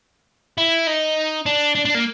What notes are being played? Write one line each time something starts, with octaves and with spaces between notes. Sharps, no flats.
E4
D#4
D4
D4
D4
A#3